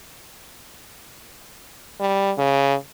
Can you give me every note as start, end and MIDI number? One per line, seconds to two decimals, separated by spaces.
2.00 2.32 55
2.38 2.75 49